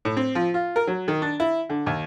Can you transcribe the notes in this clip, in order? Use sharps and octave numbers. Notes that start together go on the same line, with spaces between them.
A2
C4
F3
F4
A#4
F#3
D#3
D4
E4
D3
D#2